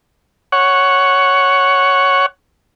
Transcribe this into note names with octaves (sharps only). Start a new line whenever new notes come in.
C#5 F#5